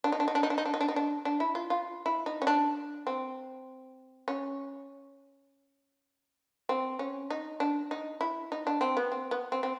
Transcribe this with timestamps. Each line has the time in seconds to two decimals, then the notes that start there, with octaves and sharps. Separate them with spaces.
0.04 D4
0.12 D#4
0.20 D4
0.28 D#4
0.35 D4
0.43 D#4
0.50 D4
0.58 D#4
0.66 D4
0.74 D#4
0.81 D4
0.88 D#4
0.96 D4
1.25 D4
1.40 E4
1.55 F4
1.70 F4
2.06 E4
2.26 D#4
2.42 C#4
2.47 D4
3.07 C4
4.28 C#4
6.69 C4
6.99 C#4
7.30 D#4
7.60 D4
7.91 D#4
8.21 E4
8.52 D#4
8.67 D4
8.81 C4
8.97 B3
9.12 C4
9.31 B3
9.52 C4
9.63 C4